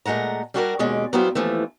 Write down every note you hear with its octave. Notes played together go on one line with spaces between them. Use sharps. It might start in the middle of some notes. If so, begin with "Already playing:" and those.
A#2 G#3 A3 F#5 A#5
G3 D4 F#4 G4 A4 A#4
D#2 B2 G#3 C#4 D5
F#3 G3 B3 E4 F4 C5
D#2 E3 F3 A3